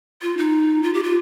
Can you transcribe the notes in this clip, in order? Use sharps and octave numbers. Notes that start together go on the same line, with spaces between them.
F4
D#4
F4
G4
F4